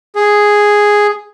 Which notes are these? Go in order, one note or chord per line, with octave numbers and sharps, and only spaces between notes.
G#4